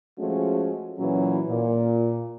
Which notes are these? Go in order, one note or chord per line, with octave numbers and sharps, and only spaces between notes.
F3 G#3 A3 C#4 F#4
A#2 E3 F#3 C#4
A#2